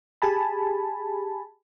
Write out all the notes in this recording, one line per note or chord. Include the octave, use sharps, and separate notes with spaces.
G4 G#4 G#5 A5 B5